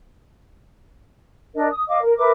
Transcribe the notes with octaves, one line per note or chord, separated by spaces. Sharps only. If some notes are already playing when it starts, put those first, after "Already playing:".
D4 A#4 D#5
D#6
D#5 F5 D6
A#4
A#4 B4 E5 D6